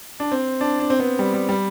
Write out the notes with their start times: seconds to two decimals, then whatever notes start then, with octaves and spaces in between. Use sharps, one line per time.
0.20 D4
0.32 C4
0.61 D4
0.80 D4
0.90 C4
1.00 B3
1.19 G3
1.34 G3
1.49 G3